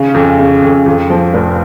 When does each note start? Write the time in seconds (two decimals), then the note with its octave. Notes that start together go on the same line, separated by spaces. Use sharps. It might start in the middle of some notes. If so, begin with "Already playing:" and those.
Already playing: C#3
0.14 F2
0.38 C#3
0.62 F2
0.86 F2
1.10 F3
1.34 F1